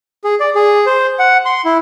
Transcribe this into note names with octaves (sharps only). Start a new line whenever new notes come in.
G#4
D5
G#4
C5
F#5
C6
E4